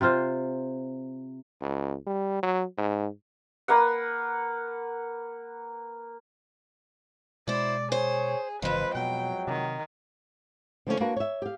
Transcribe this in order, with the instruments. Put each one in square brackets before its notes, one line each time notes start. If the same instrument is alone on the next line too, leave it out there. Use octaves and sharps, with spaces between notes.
[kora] C3 C4 F4 C5
[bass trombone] C#2
G3
F#3
G#2
[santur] A#3 B4 F#5
[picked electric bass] B2 G#3 [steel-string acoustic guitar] E4 C5 [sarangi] D5
[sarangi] G#4 [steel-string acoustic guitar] C5 [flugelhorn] C#5
[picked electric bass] G1 C#3 E3 [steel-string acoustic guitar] F2 G#3 [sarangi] B4 [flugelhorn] C5
[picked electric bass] B2 [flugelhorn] F#3 [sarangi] G5
[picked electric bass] C3 [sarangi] D#3
[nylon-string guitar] D3 F3 A3 A#3 C4 C#4
A#3 D4 F#4 A#4 B4
C#5 E5
G4 F5